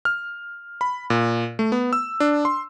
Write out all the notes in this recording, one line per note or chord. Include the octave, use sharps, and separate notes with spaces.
F6
B5
A#2
A3
B3
E6
D4
C6